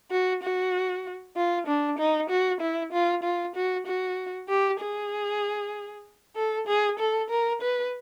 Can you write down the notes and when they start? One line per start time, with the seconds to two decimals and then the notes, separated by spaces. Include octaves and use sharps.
0.11 F#4
0.43 F#4
1.36 F4
1.67 D4
1.98 D#4
2.30 F#4
2.61 E4
2.92 F4
3.23 F4
3.55 F#4
3.86 F#4
4.49 G4
4.80 G#4
6.36 A4
6.67 G#4
6.99 A4
7.30 A#4
7.61 B4